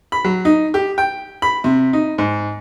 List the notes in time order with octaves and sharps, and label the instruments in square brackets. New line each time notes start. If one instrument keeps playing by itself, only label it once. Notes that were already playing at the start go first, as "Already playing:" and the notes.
[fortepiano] B5
F#3
D#4
G4
G5
B5
C3
D#4
G#2